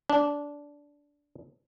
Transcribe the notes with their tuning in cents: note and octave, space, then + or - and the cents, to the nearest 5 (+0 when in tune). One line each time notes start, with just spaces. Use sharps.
D4 -15